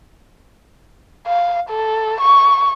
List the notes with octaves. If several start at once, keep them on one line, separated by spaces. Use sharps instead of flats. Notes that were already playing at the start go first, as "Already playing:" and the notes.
F5
A4
C#6